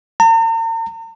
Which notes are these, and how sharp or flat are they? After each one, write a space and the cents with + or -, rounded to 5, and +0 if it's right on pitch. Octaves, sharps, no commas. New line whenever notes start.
A#5 -45